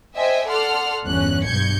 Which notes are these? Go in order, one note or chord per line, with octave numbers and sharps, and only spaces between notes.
C5 D#5 E5 G5 G#5
A4 D5 F#5 C6 F6
G1 E2 C#4 F#6
B1 G2 G6 G#6 C#7